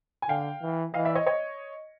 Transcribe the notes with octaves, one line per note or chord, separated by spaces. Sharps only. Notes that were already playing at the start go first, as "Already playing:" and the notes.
G#5
D3 F5 G5
E3
E3 D#5 F5
D5 E5
C#5 D#5
C#5 D#5